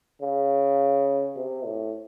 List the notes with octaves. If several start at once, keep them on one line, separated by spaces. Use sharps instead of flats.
C#3
C3
A2